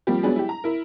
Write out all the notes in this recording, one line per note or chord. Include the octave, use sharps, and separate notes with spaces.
F3 G3 A#3 C4 G4
F#3 G#3 B3 D4 G#4
E4 G4
A#5
E4 A#4